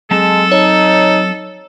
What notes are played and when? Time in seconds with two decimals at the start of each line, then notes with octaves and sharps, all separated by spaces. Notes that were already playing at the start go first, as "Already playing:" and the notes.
0.11 F#3 G#3 C4 A4 A5
0.52 D#4 C#5